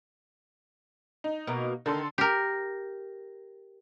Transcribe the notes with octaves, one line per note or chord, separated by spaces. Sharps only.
D#4
B2 A#3
D3 D#3 A4 C6
G4 A#4